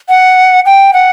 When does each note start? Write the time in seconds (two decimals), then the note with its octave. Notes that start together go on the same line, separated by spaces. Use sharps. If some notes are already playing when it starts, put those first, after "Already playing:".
0.09 F#5
0.66 G5
0.93 F#5